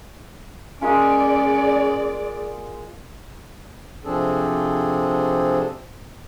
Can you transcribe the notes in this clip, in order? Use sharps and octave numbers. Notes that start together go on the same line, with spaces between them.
G#3 A#3 C#4 F4 G#4 D5
C3 F3 C4 D4 G#4 A4